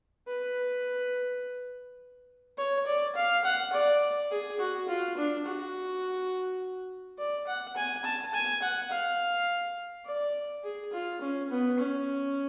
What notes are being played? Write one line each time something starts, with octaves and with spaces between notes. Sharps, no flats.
B4
C#5
D5
F5
F#5
D5
G#4
F#4
F4
D4
F#4
D5
F#5
G#5
A5
G#5
F#5
F5
D5
G#4
F4
C#4
B3
C#4